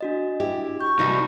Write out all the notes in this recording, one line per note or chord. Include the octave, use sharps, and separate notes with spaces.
D4 F#4 D#5
E4 G4
C#6 G6
C2 D#4 F#4